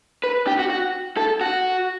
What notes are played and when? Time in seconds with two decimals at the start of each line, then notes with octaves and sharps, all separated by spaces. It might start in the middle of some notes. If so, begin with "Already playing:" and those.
0.24 B4
0.47 G4
0.59 F#4
0.70 F#4
1.17 A4
1.41 F#4